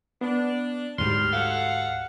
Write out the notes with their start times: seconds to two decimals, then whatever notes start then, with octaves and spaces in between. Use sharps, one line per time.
0.21 B3 D4
0.98 D2 G#2 G3 C6 F6
1.33 F#3 G4 A4 F5 F#5